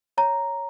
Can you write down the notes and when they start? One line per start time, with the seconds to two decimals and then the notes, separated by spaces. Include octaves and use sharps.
0.18 C#5 A#5